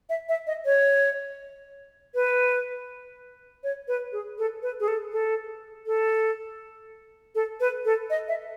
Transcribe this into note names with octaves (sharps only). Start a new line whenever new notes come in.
E5
E5
D#5
C#5
B4
C#5
B4
G#4
A4
B4
G#4
A4
A4
A4
A4
B4
A4
D#5
E5